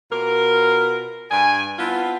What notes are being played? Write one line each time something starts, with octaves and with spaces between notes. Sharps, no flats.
B2 F4 A#4
G2 D5 G#5
B3 C4 E4 F4 A5